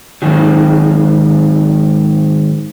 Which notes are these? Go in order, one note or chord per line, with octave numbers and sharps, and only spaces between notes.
G#2 D#3 F#3